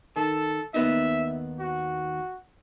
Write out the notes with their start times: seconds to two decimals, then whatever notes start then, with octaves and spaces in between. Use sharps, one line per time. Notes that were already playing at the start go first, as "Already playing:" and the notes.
0.16 D#3 A4
0.74 D#2 B3 D#4 E5
1.59 F#4